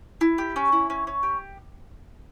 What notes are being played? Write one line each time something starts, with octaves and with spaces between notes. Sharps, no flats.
E4
G4
C#4
E4
C#4
C#4
G4